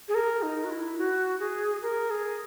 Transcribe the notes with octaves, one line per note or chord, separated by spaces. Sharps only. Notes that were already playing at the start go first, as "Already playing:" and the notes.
G#4
A#4
D#4
F#4
E4
F#4
G#4
A#4
G#4